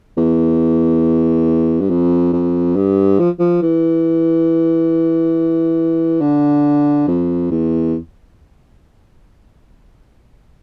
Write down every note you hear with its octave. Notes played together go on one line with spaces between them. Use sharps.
E2
G2
F2
F2
G2
F3
F3
E3
D3
F2
E2